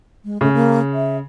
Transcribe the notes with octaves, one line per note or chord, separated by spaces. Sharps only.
G#3
C#3 A3
A#3
E5